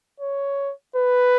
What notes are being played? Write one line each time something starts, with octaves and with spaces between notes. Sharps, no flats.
C#5
B4